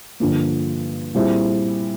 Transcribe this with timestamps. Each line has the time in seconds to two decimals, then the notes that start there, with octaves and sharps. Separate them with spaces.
0.20 G2 D3 F3 A#3
1.15 A#2 G3 C4 E4 G#4